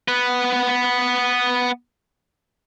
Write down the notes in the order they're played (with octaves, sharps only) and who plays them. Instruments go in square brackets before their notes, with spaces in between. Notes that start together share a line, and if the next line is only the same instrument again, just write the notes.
[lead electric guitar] B3 B4